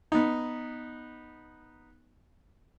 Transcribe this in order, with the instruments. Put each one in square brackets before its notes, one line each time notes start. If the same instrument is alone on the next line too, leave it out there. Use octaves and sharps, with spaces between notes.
[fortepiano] B3 D#4